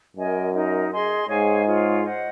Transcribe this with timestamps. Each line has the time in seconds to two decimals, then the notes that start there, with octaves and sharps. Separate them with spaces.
0.16 F#2 A#4 D#5 G#5
0.54 D#4 A#4 D#5
0.91 G#4 D#5 G#5 C6
1.28 G#2 G#4 C#5 F5 G#5
1.66 F4 G#4 C#5
2.03 C5 D#5 F#5